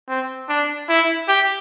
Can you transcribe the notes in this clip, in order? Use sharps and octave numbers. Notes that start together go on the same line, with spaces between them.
C4
D4
E4
G4